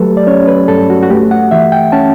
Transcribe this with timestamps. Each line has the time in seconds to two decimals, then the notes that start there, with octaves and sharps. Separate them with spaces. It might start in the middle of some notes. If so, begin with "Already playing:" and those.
Already playing: F#3 A3 G4 A4 B4
0.17 D5
0.27 C#4 C#5
0.47 B4
0.68 G2 A4
0.90 F#4
1.03 F#4
1.10 A3 G4
1.31 F#5
1.51 E3 E5
1.72 G5
1.92 C#4 A5